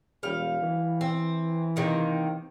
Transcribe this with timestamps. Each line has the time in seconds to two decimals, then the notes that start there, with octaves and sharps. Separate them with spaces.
0.23 E1 G3 F5
0.62 E3
1.01 C4
1.76 C3 D#3 A#3